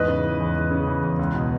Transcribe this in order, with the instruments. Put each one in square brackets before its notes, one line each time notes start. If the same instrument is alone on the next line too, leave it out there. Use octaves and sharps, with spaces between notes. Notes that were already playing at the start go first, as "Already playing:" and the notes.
Already playing: [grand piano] E2 G#2 B4 D#5
C#3
E3
E2
E2
C#3
E3
E2
C#2
B2